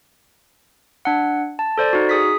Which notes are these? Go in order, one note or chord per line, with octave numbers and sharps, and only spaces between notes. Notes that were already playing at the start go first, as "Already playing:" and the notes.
D4 F#5
A5
A4 C5 D5
D#4 F#4
G#4 D#6 B6